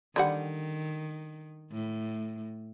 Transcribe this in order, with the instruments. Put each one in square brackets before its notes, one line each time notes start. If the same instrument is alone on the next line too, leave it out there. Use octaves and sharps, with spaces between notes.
[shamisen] D3 G3 F#5 [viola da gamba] D#3
[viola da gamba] A2